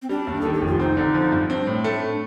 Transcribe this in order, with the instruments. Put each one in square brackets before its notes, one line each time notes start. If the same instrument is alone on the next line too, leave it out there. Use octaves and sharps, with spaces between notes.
[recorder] C4
[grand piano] G3 [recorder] D4
[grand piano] D#2
[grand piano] D#3 [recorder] A4
[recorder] G4
[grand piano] F1
[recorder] F4
[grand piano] C4 [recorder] D#4
[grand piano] D3
F3
G2
[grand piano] C4 [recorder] D4
[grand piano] A2
A3